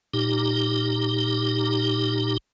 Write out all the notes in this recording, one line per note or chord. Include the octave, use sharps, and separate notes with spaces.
A#2 D#4 G4